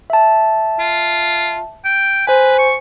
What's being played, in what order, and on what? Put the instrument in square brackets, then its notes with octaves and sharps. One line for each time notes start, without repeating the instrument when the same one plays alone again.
[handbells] E5 A5
[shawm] F4
G5
[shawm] B4 [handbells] C5 G#5
[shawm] C#6